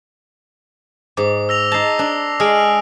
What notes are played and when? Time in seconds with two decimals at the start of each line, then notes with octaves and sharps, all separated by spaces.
1.17 G#2 D6
1.49 E6 A#6 F7
1.72 D#4 A5 A#6 C7
1.99 D4
2.40 G#3 D#6 F6 D7